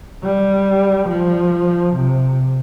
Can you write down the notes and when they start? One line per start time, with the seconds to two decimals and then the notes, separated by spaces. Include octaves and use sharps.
0.24 G3
1.09 F3
1.95 C3